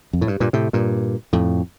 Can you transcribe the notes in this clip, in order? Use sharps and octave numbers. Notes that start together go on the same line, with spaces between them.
F2
A2
G2
G2 A#2
A2 C3
G2 A#2
F2 A2